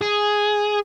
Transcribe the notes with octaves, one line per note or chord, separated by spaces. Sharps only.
G#4